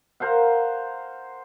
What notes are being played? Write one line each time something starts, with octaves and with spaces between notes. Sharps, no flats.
A#4 C5 F5 F#5